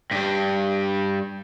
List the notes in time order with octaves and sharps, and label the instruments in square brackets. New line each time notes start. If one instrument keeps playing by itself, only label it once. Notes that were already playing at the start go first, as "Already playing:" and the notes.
[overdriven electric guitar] G2 G3